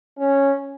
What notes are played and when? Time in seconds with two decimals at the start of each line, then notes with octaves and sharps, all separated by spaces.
0.18 C#4